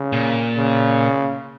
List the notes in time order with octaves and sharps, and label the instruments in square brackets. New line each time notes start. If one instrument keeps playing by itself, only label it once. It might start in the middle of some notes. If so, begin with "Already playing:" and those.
Already playing: [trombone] C#3
[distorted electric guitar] A#2
[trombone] C#3